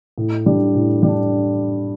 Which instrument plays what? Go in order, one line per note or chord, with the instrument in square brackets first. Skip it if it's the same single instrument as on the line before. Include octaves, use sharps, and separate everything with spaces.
[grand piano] A2
G3 D4
A2
G3
D4